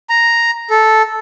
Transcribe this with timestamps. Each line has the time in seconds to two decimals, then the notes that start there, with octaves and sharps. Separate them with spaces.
0.10 A#5
0.70 A4